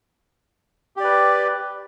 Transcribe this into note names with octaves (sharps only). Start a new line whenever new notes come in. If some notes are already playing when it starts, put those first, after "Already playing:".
G4 B4 D5